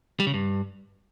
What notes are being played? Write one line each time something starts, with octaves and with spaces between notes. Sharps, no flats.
G3
C#3
G2